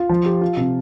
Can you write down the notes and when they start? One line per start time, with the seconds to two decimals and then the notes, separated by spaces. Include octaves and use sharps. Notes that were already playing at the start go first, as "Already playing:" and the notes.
Already playing: F4
0.09 F3
0.26 G4
0.41 F4
0.57 C3